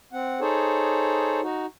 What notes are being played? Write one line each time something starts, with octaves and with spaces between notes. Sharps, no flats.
C4 F#5
D#4 G#4 A4 C5 C#5
D#4 F#4